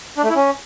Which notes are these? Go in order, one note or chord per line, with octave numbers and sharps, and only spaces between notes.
D4
A3
E4
C#4